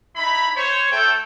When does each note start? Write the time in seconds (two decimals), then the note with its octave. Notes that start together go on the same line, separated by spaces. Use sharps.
0.15 D#4 E4 B5
0.56 C5 C#5
0.92 A3 E4 A4 G5